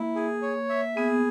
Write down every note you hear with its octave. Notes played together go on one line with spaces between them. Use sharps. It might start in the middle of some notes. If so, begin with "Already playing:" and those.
Already playing: A#3 E4
G#4
C#5
E5
B3 G#4